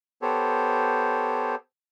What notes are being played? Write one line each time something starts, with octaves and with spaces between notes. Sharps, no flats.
B3 G4 A4 C5 C#5